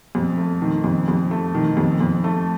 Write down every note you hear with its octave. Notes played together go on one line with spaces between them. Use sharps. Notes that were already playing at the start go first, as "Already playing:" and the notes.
F2
A3
D#3
F2
F2
A3
D#3
F2
F2
A3